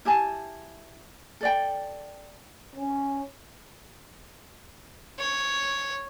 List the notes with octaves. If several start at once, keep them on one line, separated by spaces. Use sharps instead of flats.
E4 G4 G#5 A5
A4 D5 G5
C#4
C#5